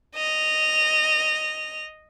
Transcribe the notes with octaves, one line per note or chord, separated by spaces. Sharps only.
D#5 F7